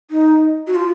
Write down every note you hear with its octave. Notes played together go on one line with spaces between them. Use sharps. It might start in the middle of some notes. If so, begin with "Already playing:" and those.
D#4
F#4
F4